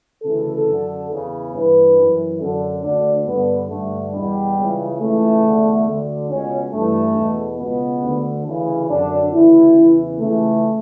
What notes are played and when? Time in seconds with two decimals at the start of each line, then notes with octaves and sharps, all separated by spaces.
0.23 D2 C#3 E3 A4
0.67 F#2 D3
1.10 E2 C#3 E3
1.53 G2 E3 B4
1.97 F#2 E3
2.40 F#2 D3 A4
2.83 D2 D3 D4
3.27 G2 D3 B3
3.70 G2 D3 A3
4.13 E2 B2 G3
4.56 C#2 C#3 E3
5.00 C#2 C#3 E3 A3
5.44 E2 D3
5.87 D2 D3
6.29 C#2 B2 C#4
6.73 G2 E3 A3
7.16 E2 B2
7.59 C#2 B2 B3
8.03 D2 D3
8.46 D2 C#3 E3
8.90 F#2 D3 D4
9.33 D2 C#3 E3 E4
9.77 E2 C#3 E3
10.20 C#2 C#3 E3 A3